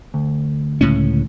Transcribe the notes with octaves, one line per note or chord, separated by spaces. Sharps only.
D2
C#2 A2 C#4